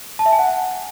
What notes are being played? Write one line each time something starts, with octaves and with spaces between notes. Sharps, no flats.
A5
E5
G#5
F#5